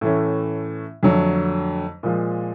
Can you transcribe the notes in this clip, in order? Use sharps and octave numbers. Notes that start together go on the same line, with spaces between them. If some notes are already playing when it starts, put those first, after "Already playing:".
A2 E3 A3 C#4
F2 D3 F#3 A3
A#2 F3 G#3